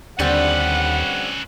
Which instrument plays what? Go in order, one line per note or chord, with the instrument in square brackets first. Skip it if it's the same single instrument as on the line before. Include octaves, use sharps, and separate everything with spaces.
[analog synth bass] D#2 [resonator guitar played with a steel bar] D3 G3 C4 [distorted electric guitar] C#4 B4 [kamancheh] F#5